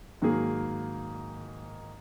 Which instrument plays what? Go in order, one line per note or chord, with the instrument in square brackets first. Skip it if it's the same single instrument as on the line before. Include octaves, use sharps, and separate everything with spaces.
[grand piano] G#2 D#3 F#3 A#3 G#4